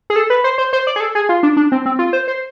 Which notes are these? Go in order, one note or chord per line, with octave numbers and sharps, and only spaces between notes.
G#4
A4
B4
C5
C5
C5
D5
G#4
A4
G#4
F4
D4
D4
C4
C4
F4
C5
C5